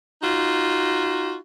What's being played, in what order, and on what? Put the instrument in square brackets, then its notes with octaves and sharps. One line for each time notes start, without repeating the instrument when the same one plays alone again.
[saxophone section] D#4 F4 F#4